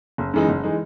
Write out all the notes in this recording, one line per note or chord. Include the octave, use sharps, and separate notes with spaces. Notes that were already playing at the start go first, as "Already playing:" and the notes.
F#1
F#2 E3 G#3 D#4
F#1
E3 G#3 D#4